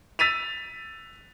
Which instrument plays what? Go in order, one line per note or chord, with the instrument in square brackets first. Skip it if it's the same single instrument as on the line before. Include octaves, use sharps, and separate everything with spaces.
[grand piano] E6 A6 B6 D#7 F7